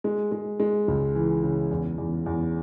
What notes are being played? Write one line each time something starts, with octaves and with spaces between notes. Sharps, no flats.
G#3
G#3
G#3
C#2
E3
C#3
E2
E2
E2